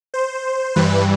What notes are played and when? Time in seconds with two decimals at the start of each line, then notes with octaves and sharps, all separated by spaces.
0.14 C5
0.76 G2 E3 G3 B4